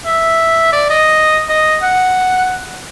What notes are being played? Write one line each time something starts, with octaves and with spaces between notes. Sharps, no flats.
E5
D5
D#5
D#5
F#5